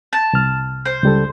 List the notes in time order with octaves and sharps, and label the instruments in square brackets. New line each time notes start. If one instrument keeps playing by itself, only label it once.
[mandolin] A5
[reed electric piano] C2 F6
[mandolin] C5
[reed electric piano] C#2 G3 A4